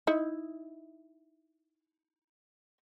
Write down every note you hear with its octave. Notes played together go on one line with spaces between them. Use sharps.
D#4 E4